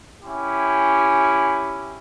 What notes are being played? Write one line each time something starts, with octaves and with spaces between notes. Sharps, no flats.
C#4 E4 G4